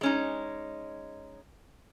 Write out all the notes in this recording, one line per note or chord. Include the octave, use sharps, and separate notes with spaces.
G#3 C#4 D#4